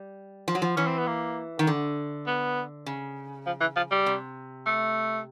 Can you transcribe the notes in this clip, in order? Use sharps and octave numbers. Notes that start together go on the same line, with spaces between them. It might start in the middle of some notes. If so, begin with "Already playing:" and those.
Already playing: G3
F3
F#3
F3
E3 C#4
C4
B3
A#3
D#3
D3
B3
C#3
F3
E3
F3
G3
C3
A3